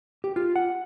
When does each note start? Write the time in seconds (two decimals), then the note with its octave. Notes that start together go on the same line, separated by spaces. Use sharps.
0.24 G4
0.36 F4
0.56 F#5